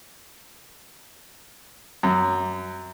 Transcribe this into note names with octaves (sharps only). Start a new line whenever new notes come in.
F#2